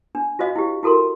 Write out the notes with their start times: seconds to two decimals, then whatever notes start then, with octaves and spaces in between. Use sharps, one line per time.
0.15 D4
0.39 F4 F#4 C5 D#5 F5
0.56 E4 G4
0.83 E4 F#4 A4 A#4 C6